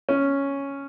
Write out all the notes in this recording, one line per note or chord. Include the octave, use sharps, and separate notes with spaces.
C#4